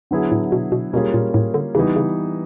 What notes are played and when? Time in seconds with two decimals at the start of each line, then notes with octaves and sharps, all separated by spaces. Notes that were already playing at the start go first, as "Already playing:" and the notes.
0.11 D3 F#3 B3 E4 G#4
0.31 A2
0.52 B2
0.72 B2
0.93 B2 G3 A#3 C#4 F4 G#4
1.14 A#2
1.34 A2
1.54 D3
1.75 C#3 E3 G3 B3 D#4
1.96 C#3